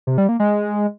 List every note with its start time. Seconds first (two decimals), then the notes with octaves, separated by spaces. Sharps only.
0.07 C3
0.18 G3
0.29 A#3
0.40 G#3